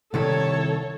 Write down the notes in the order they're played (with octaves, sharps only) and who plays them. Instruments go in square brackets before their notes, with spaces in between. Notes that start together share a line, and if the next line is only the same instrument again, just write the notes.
[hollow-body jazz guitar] C2 D#3 E4 [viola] A4 C#5